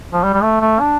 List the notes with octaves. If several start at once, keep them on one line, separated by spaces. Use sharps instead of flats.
F3
G3
G3
A3
A3
D4